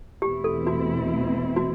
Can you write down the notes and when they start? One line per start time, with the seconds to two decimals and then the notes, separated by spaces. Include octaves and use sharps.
0.21 E2 B2 A3 C4 E4 G4
0.44 A4
0.67 F#4
1.56 F#4